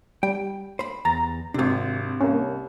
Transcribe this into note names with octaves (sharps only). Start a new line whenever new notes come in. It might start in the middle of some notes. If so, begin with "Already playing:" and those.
G3 G5
C5 B5
E2 A#5 A6
G#1 C3 C4 D4
C2 A#3 C#4